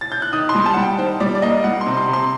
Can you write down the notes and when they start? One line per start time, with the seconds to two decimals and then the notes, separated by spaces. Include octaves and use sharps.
0.01 A6
0.12 G6
0.22 F#6
0.33 D#3 D#6
0.49 C6
0.55 G3
0.66 A5
0.74 G3 F#5
0.82 G5
0.98 D#3 C5
1.20 G3 D5
1.35 D5
1.42 A#3 D#5
1.64 G3 F#5
1.81 C6
1.86 C3
1.97 C6
2.08 C3
2.13 C6